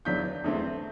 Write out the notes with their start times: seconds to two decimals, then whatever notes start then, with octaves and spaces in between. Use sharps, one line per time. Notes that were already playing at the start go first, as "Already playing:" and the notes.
0.05 E2 D3 F#3 B3 D4 G6 B6
0.44 E2 D3 A3 C4